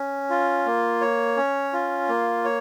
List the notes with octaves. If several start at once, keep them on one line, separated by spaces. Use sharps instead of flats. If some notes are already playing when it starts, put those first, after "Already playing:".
Already playing: C#4
F4
A#3
C#5
C#4
F4
A#3
C#5